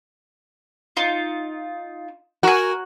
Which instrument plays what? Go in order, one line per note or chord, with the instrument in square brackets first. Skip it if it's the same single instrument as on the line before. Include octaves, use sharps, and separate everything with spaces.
[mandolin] D#4 F4
[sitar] F#4 [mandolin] A#4 G#5